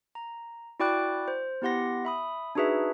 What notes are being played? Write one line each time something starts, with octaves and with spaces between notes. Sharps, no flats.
A#5
E4 F#4 D5 G5 D6 F#6
C5
B3 E4 G4 F#5 C6 A#6
E5 B5 D#6
D4 D#4 F#4 G#4 B4 E5